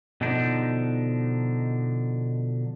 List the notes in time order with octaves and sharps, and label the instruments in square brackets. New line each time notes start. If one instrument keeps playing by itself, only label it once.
[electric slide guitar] B2 D3 F3 D4 D#4